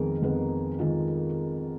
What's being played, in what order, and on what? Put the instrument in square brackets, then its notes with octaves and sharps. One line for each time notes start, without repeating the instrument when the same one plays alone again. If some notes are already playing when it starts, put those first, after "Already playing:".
Already playing: [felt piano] F2 D#3 G#3 B3 G#4 A#4
F2 D#3 G#3 B3
D#3 G#3 F4